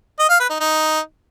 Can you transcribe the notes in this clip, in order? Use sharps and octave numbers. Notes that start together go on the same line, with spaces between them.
D#5
F5
B4
D#4
D#4